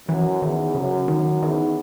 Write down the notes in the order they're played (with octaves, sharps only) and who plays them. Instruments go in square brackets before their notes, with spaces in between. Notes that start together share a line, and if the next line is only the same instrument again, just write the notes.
[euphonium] F#2 [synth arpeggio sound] E3
[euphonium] E2 [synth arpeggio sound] D#3
[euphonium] F#2 [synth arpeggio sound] C#3
[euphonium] F#2 [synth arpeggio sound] D#3
[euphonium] E2 [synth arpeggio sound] D#3